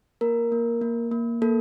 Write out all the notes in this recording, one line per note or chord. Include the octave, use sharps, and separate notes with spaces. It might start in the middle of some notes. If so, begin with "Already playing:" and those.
A#3 A#4
A#3
A#3
A#3
A#3 A4